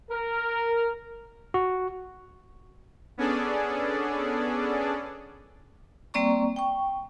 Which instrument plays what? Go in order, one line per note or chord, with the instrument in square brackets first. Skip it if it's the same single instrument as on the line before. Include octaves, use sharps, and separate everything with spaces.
[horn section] A#4
[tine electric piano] F#4
[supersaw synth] B3 C#4 D4 G#4 A4 D5
[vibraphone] G3 A#3 C4 D5 A#5 C#6
G5 C#6